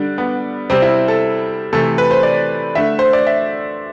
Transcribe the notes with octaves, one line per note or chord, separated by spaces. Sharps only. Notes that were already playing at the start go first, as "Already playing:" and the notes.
Already playing: D3 G3 D4
B3
C3 G3 C4
E4
A4
C3 E3 A3 A4
B4
C5
D5
D3 A3 E5
C5
D5
E5